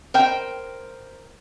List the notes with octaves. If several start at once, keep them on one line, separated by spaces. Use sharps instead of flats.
A#4 C5 G5